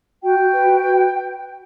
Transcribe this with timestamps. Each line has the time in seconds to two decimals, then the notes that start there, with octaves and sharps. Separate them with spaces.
0.22 F#4 G5
0.38 F#4
0.52 B4
0.67 F#4
0.83 B4